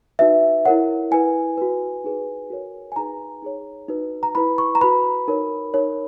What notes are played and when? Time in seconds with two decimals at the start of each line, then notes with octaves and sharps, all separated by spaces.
0.19 D#4 F#4 B4 E5
0.65 E4 A#4 C#5 F#5
1.11 E4 B4 G#5
1.58 F#4 B4
2.04 D#4 G#4 B4
2.50 F#4 A#4 C#5
2.92 G#5
2.96 D#4 G#4 B4 A#5
3.42 D#4 G#4 C#5
3.89 D#4 F#4 B4
4.23 A#5
4.35 E4 B4 B5
4.58 C#6
4.75 A#5
4.81 F#4 B4 B5
5.28 D#4 A#4 C#5
5.74 D#4 A#4 C#5